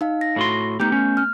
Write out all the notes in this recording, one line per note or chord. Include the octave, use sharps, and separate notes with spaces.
D#4 F5
A#6
A2 F#4 C6
A3 B3 D#4 G4 G6
C#4
F6